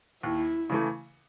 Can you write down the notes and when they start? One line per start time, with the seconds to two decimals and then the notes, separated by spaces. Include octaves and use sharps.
0.23 D#2 E4
0.70 C#3 E3 A3